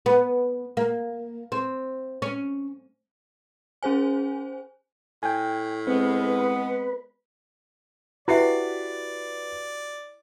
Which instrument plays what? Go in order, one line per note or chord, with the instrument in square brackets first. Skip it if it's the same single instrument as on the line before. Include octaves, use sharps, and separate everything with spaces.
[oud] B3
A#3
C4
C#4
[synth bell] C#4 G#4 C5 G#5
[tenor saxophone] A2 [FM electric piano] G5 G#5
[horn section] G#3 B3 [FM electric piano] C4 [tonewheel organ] B4
[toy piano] E4 E5 [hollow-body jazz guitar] F#4 G4 [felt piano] B4 C7 [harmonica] D5